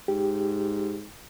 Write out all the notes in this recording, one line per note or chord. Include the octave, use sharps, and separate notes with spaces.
G#2 G4